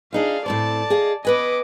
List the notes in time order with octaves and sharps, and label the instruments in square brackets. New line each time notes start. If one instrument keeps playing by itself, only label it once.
[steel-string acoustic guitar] D4 D#4 F4 [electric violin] G#4 F5
[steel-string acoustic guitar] A2 C4 C5 [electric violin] D5 A5
[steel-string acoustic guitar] G#4 D#5 F5
[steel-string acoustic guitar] B3 B4 G#5 [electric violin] D#5 D6